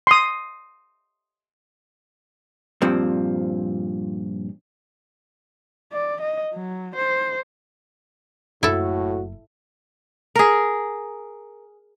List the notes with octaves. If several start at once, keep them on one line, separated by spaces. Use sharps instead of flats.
C6 D#6
G2 A#2 F3 C4
D5
D#5
F#3
C5
F#1 A2 E4 F#4 A4
G#4 A#4